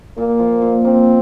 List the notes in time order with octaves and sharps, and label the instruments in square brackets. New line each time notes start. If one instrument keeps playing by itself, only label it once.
[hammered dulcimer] A#2 [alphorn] A#3
[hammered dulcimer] F3
A#2
[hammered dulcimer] A#3 [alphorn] C4